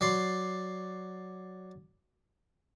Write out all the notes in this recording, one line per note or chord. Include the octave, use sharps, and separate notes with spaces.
F#3 D5 C6